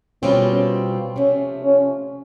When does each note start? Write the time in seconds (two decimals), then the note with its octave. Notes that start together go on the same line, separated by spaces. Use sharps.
0.22 B2 G3 C4 C#4 F4
1.16 C3 F3 A3 C#4
1.63 C#4